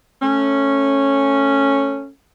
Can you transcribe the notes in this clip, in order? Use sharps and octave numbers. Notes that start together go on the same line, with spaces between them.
A3 C#4